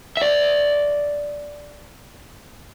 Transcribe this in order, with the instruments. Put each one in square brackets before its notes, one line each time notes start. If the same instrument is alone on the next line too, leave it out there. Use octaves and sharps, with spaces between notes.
[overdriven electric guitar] D5 E5